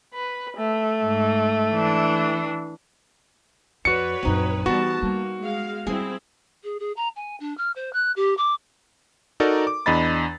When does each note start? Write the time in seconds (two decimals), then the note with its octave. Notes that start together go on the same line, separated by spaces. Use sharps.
0.14 B4
0.57 A3
1.02 G#2
1.73 E3 D4
3.85 F2 F#4 B4 C#5 D5 C#7
4.23 A#1 F#2 C4 D#4
4.66 E3 G3 B3 F#4 A5
5.03 G3 A#3
5.41 G#3 F5
5.87 G3 C4 E4 G#4
6.64 G#4
6.80 G#4
6.96 A#5
7.16 G#5
7.40 D4
7.58 F6
7.76 C5
7.93 F#6
8.16 G4
8.37 D6
9.40 D#4 F#4 A4 A#4 D5
9.67 D6
9.86 E2 D4 D#5 B5 A6